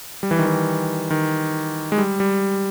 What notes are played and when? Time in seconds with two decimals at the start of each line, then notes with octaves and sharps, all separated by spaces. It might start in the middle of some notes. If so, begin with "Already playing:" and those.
0.23 G3
0.31 E3
0.39 D#3
0.46 E3
1.10 D#3
1.92 G#3
1.98 G3
2.20 G3